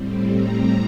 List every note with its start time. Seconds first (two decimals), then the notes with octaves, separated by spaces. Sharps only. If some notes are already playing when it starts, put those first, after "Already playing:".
Already playing: A2 G3 C4
0.32 A#5